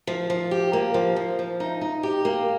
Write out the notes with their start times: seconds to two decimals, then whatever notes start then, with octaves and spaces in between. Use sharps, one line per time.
0.07 F3
0.30 F3
0.51 G4
0.73 A#3
0.94 F3
1.16 F3
1.39 F3
1.60 D#4
1.81 D#4
2.03 G4
2.25 A#3